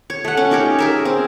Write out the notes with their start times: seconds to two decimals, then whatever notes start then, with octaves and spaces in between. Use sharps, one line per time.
0.10 C#5
0.25 A3 F#5
0.37 C#4
0.51 D#4 G4 A#4 C#5
0.78 G#4 A#4 E5
1.05 C4